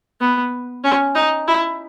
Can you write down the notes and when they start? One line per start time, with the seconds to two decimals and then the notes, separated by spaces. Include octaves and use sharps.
0.21 B3
0.84 C#4
1.15 D#4
1.48 E4